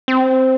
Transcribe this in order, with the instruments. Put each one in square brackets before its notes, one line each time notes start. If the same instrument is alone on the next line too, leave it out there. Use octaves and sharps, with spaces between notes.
[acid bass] C4